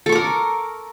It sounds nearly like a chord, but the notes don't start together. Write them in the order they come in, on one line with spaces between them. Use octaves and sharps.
A4 C#6 D6 A#4